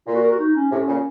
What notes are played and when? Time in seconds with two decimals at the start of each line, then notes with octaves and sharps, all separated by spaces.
0.07 A#2 F4
0.15 F#4
0.24 A#4
0.32 F#4
0.39 D#4
0.56 C#4
0.71 A2 C3 C#4
0.88 A#2 C#3